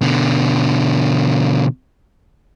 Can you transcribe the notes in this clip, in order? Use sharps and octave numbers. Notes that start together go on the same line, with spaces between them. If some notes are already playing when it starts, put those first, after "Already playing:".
B2 D3